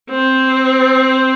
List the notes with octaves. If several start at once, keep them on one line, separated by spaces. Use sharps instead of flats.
C4